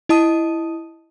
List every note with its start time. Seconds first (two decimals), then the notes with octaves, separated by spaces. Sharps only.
0.09 E4 D#5 A5 D#6 D#7